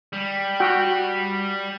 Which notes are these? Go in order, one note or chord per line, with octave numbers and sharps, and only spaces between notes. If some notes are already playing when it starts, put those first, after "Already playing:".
G3
F#4 G5